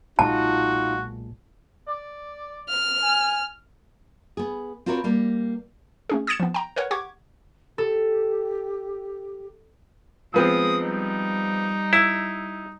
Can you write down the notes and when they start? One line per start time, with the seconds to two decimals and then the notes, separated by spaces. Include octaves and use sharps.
0.19 B1 A#2 G#3 D#4 F4 F#4 A5
1.87 D5
2.69 F6
3.02 G#5
4.37 B3 G#4
4.86 C4 F4 F#4 A#4 B4 C#5
5.04 G3 A#3 G4
6.09 A3 C#4 G#4
6.27 D#6 G#6 A6 C#7 E7
6.40 F3 B3
6.54 G5 A#5
6.76 A#4 B4 C#5 F#5
6.91 G4 F#5 C#6 D6 G#6
7.78 G4 A4
10.34 F3 G#3 B3 C4 D#6
10.83 G3 D#4
11.93 E4 E6